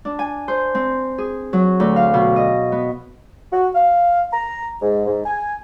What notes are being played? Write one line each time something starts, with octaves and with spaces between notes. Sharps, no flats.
D4
G#5
C5
C4
G#4
F#3
D2
F5
B2
D#5
B3
F#4
F5
A#5
G#2
G#2
G#5